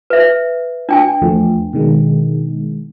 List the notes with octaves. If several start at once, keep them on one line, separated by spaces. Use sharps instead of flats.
B4 E5
D4 G5 G#5
E2 F3 A3
B2 D#3 G#3